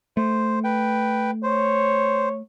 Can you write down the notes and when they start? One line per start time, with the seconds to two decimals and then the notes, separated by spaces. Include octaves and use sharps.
0.17 A3 C5
0.64 B4 G5
1.43 C5 C#5